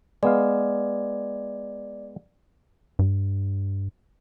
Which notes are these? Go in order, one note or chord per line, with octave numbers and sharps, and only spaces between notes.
G#3 B3 D5 F5
G2